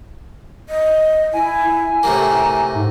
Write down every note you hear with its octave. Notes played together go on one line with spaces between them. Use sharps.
D#5
E4 G#5
A2 C3 A#3 A#5
G#2